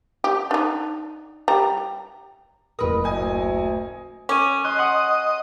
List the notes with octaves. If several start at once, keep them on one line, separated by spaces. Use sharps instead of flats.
G4
D4 D#4
G3 A#5
F#1 A2 A#4 B4 D#6
D2 D#5 G#5
C#4 D6 D#7
D#5 C6 F#6
F#5 C6 D#6